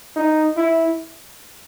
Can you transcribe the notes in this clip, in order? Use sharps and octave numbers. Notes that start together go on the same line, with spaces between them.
D#4
E4